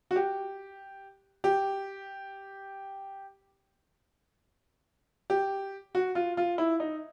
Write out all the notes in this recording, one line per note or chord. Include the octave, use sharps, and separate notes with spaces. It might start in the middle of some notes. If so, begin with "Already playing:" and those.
F#4
G4
G4
G4
F#4
F4
F4
E4
D#4